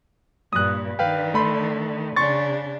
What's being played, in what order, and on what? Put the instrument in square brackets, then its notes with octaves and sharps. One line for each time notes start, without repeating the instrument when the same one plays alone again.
[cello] G2 A#2 [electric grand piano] D#6 F#6
[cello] D#3 D4 [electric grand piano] B4 F5 G5
[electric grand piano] A3 B5 C6
[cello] C#3 D4 [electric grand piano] C6 C#6 A6